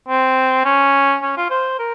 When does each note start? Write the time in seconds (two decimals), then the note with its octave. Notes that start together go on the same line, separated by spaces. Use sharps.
0.09 C4
0.65 C#4
1.22 C#4
1.37 F4
1.50 C5
1.79 A#4